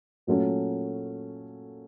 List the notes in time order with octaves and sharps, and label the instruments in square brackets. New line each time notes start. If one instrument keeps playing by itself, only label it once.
[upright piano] A#2 F#3 A3 C#4